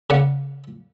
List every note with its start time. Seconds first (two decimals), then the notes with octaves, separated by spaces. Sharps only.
0.10 C#3 D5 F#5